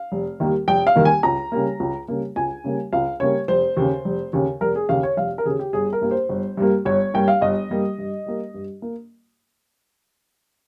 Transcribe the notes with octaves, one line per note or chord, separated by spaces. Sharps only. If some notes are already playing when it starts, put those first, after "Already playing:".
Already playing: F5
F1
D#2 D#3 G3 A#3
F1 G5
F5
D#2 D#3 G3 A#3
G#5
C#2 A#5
C#3 G3 A#3
C#2
C#3 G3 A#3
C#2 G#5
C#3 G3 A#3
C#2 F5
C#3 G3 A#3 C#5
F1 C5
D#2 C#3
F1
D#2 C#3
F1 A#4
G#4
D#2 C#3 F5
C#5
F1 F5
A#4
D#2 C#3 G#4
G4
G1 G#4
A#4
G2 G3 A#3
C5
G1
G2 G3 A#3
G1 C#5
G2 G3 A#3 G5
F5
G1 D#5
G2 G3 A#3
G2
G3 A#3
G2
A#3